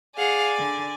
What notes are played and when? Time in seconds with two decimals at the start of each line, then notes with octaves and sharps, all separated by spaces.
0.17 G#4 D5 F5 F#5 G#5
0.59 D3